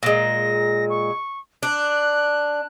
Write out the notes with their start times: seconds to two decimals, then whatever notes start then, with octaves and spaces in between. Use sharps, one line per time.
0.03 A#2 G#3 A#6
0.90 C#6
1.63 D4 F#6